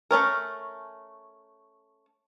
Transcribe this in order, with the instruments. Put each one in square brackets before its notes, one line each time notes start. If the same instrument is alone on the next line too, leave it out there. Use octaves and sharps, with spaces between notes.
[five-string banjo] A3 C#4 A#4